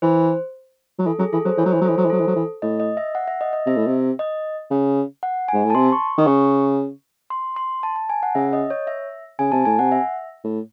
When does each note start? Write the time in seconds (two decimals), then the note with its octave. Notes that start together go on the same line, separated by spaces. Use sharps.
0.02 E3 C5
0.99 F#3
1.06 E3 A4
1.19 F#3 G#4
1.33 E3 A4
1.45 F#3 C5
1.58 E3 C#5
1.66 F#3
1.71 E3 C5
1.81 F#3
1.85 A4
1.89 E3
1.97 F#3 C5
2.05 E3
2.10 F#3 A4
2.20 E3
2.28 F#3
2.36 E3
2.62 A2 D#5
2.80 D#5
2.97 E5
3.15 F#5
3.27 E5
3.41 D#5
3.53 D#5
3.67 C3 E5
3.77 A2
3.87 C3
4.19 D#5
4.71 C#3
5.23 F#5
5.48 G#5
5.53 G#2
5.64 A2
5.70 A5
5.75 C3 C6
5.92 C#6
6.18 D#3
6.27 C#3 C#6
7.30 C6
7.56 C6
7.83 A5
7.96 A5
8.10 G#5
8.23 F#5
8.35 C#3 E5
8.53 D#5
8.70 C#5
8.87 E5
9.39 C#3 G#5
9.52 C3 A5
9.65 A2 G#5
9.79 C3 F#5
9.92 E5
10.44 A2